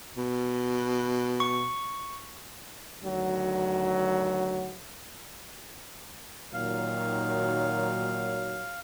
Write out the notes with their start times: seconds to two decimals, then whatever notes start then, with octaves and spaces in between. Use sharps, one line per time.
0.17 B2
1.40 C#6
3.03 D2 D#3 F#3
6.54 A#2 D#3 F#3 F5